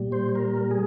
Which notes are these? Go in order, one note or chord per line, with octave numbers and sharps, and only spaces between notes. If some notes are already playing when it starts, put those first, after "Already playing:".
Already playing: A#2 G3
C5
A#4
G#4